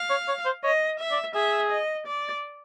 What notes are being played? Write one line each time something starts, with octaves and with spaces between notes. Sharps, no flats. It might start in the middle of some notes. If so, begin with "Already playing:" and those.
Already playing: F5
C#5
C#5
C5
C#5 D#5
E5
D5
G#4 E5
D#5
D5